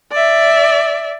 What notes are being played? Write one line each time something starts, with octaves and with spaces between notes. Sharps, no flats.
D5 E5